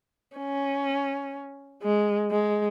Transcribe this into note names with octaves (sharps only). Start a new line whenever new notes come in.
C#4
G#3
G#3